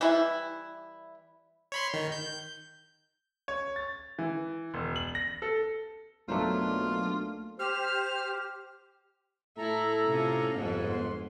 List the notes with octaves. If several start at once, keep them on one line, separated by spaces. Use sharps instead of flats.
E3 G3 E4
C#5 B5 C6
D#3
G6
C#5
A6
E3
E1
F#7
A#6
A4
B1 F#3 A3 A#3 D4 F4 C5
G4 C5 F6
A2 E4 A4 A#5
C3 C#4 F4
G1 F2 G#2 B3
C6